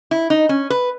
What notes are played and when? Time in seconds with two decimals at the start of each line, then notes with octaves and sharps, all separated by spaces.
0.11 E4
0.30 D#4
0.49 C#4
0.70 B4